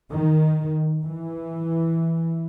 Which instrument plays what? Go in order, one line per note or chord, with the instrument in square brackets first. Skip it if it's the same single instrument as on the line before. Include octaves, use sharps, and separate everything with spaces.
[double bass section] D#3
E3